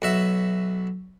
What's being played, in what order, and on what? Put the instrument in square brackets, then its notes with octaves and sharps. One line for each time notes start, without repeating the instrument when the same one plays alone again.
[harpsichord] B1 F#4 E5